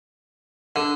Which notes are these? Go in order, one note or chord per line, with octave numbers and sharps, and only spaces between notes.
D3